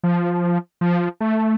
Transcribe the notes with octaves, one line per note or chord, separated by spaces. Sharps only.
F3
F3
A3